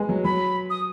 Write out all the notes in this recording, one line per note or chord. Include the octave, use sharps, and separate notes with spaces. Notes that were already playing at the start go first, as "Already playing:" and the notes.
Already playing: G#3 B3
F#3
F#3 B5
D#6